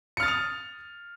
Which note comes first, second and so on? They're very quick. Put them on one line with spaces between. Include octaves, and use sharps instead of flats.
C#7 F6 A6 D#6 F7